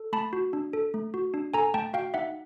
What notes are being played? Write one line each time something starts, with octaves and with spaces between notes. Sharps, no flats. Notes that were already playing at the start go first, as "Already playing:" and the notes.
Already playing: A4
A3 A5 B5
F#4
D4
A4
A3
F#4
D4
A4 G#5 A#5
A3 G5 A5
F#4 F5 G5
D#4 E5 F#5